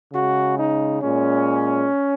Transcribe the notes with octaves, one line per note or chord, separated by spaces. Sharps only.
C#3 G#3 F#4
D#4
A#2 G#3 C#4